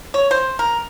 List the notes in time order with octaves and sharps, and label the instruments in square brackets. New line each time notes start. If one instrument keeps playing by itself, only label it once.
[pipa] C#5
C5
A#4